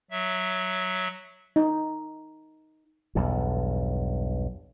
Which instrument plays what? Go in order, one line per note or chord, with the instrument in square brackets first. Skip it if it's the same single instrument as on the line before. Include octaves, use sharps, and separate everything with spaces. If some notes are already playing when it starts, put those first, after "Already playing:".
[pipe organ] F#3 E5
[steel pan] D#4
[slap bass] B1 E2 G2